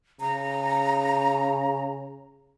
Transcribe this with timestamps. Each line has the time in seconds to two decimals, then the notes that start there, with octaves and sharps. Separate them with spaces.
0.21 C#3 A#5